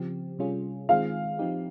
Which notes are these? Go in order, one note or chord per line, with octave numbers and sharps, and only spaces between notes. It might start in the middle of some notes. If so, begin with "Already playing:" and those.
Already playing: C#3 F3 C4 G4
C3 G3 C#4 F4 G#4
D#3 G#3 C4 F4 G#4 F5
F3 C4 D#4 G4